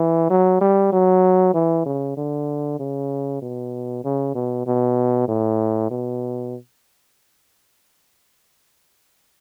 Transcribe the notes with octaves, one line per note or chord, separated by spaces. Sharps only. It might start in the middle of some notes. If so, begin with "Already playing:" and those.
Already playing: E3
F#3
G3
F#3
E3
C#3
D3
C#3
B2
C#3
B2
B2
A2
B2